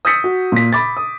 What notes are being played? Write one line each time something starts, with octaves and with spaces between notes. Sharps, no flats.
D#6 E6 G6 A6 B6 C#7
F#4
A#2 B6
B5 D6 A6
D#6